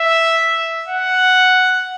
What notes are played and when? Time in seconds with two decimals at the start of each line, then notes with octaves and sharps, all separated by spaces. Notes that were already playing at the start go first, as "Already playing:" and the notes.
Already playing: E5
0.88 F#5